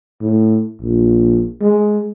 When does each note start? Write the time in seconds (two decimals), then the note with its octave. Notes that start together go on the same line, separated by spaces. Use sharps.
0.21 A2
0.81 A#1
1.61 G#3